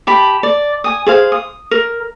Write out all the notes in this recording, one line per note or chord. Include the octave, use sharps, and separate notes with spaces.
G4 A5 B5
D5
G#5 D#6
G#4 C5 F5
D#6
A#4